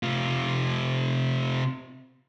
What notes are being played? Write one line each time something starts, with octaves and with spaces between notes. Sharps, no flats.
C3 F4